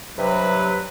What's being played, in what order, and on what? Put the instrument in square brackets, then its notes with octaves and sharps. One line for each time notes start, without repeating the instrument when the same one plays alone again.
[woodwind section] G2 C3 F#3 B4